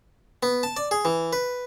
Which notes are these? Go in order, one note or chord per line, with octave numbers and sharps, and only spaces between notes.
B3
A5
D5
G#4
E3
B4